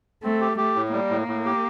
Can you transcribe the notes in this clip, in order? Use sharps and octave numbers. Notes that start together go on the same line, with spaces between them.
A3 C4
G4
A3 G4
A2
G3 A#3
A2
A2
G4